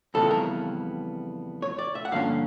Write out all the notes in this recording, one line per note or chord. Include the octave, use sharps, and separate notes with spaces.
F2 C#3 E3 G3 B3 A4
A#4
C#5
D5
E5
F#5
G2 D3 F3 A#3 C#4 F5